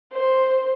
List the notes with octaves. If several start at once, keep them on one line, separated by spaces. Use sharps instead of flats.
C5